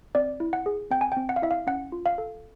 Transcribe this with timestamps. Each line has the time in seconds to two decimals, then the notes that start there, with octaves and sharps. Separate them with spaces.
0.15 C4 D5
0.40 E4
0.53 F#5
0.66 G#4
0.91 C4 G5
1.01 G#5
1.12 C4 G5
1.29 F#5
1.36 F5
1.42 E4 E5
1.51 F5
1.67 C#4 F#5
1.92 F4
2.06 F5
2.18 A4